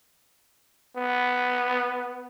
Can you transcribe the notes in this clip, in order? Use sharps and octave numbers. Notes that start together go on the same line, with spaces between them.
B3